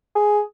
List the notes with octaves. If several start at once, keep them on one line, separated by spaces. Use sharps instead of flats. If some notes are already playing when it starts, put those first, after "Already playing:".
G#4